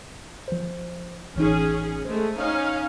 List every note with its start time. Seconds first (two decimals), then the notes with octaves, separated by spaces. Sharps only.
0.48 F3 C5
1.36 A1 E3 C#4 D#4 G#4
2.05 G#3 A3 C5
2.37 C#4 D#4 F5